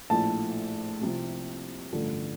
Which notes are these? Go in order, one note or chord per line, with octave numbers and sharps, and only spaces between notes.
A#1 A2 F3 A5
C2 C3 F3
A1 G2 D3 F3